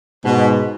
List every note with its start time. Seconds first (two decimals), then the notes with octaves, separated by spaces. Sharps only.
0.24 G#2 B2